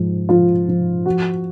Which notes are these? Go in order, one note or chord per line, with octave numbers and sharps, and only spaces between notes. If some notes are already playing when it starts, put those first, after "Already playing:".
Already playing: G#2 F3
F3 F4
F3
F3 F#4